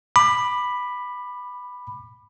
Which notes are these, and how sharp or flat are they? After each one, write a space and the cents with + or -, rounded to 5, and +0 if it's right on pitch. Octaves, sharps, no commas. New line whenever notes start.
B5 +0 D6 +25